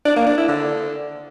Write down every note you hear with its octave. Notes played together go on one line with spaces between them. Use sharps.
D4
A#3
D4
E4
D3